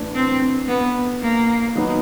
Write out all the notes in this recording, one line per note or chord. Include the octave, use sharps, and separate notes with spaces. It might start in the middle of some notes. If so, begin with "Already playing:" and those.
Already playing: A2 E3 A3 D4
C4
B3
A#3
D#3 F#3 B3